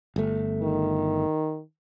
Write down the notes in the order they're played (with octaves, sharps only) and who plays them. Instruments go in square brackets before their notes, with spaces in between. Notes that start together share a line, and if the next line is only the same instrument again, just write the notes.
[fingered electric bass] G1 A3
[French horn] D#3